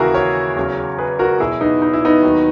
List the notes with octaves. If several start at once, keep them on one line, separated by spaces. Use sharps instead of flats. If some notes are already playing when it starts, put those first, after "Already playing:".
Already playing: D#2 C#3 E3 E4 F#4 G#4 A#4
A#4 C#5
E2 C#3 F#3
G#4 B4
F#4 A#4
E2 B2 F#3 E4 G#4
B3 D#4
D#4
E4
B3 D#4
D#2 D#3 F#3